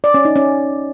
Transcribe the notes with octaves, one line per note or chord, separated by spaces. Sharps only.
D5
C#4
D#4
C#4